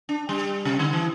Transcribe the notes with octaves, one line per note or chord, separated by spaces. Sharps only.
D4
G3
C3
D3
E3